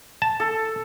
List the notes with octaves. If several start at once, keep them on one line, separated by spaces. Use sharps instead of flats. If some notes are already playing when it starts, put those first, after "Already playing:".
A5
A4